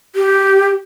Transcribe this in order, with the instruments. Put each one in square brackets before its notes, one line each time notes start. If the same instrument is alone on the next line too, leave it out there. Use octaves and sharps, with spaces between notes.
[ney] G4